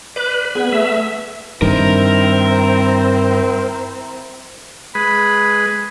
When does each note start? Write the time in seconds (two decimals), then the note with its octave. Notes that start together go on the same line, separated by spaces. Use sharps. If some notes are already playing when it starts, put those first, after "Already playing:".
0.16 B4 D5 F#7
0.55 B3 G#4 B4
0.72 A3 E5
1.62 G2 D#3 C4 E4 A#4
4.95 G#3 G#4 B4 B5